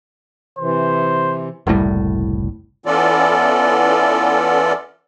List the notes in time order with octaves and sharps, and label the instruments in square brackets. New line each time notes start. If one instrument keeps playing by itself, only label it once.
[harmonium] C3 E3 [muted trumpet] C5
[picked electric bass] F#1 C2 A2 G3
[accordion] E3 B3 C#4 F4 A4 D5